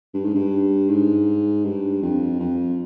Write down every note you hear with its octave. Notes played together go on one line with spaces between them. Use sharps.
G2
G#2
G2
G#2
G2
F2
F2